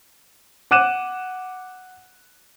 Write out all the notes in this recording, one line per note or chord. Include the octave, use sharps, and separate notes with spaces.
F#5 D6 F#6 D#7 E7